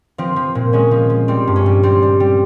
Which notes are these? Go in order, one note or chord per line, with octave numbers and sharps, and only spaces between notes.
F3 C4
F3
A#2
G#3 C#4
F3
F3
G3 C4
G2
C#4
G3
G3 C4
G3
G3